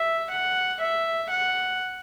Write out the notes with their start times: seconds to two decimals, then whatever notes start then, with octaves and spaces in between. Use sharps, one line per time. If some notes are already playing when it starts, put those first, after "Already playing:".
Already playing: E5
0.31 F#5
0.82 E5
1.31 F#5